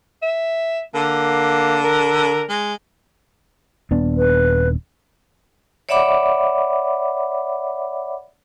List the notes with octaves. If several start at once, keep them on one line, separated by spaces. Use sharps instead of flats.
E5
D3 A#3
A#4
G#3
D#1 B3 D4
B4
C#5 D5 E5 F#5 B5 D6